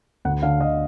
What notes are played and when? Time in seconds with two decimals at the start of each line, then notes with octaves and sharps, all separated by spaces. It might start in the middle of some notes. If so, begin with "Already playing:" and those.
0.25 D2 F#5
0.43 D3 F5
0.60 D3 D#5